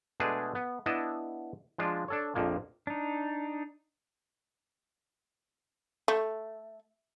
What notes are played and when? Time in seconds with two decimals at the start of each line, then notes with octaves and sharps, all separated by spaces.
0.20 B2 G#3 A3 D4 G#4 B4
0.55 B3
0.86 B3 D4 E4 D#5 A5
1.78 F3 G#3 D4 F4
2.08 D4 A4 C#5
2.35 A#1 F2 F3 A#3
2.87 D4 D#4
6.08 A3